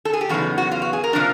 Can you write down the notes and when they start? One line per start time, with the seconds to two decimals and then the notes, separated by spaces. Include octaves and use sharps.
0.05 A4
0.13 G#4
0.21 G4
0.29 E2 C#3 F#3 B3 D#4 F#4
0.58 F#4
0.71 F4
0.82 F#4
0.93 G#4
1.04 A#4
1.13 C3 F3 A#3 D4